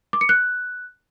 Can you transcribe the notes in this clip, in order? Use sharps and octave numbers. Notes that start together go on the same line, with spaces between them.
D6
C#7
F#6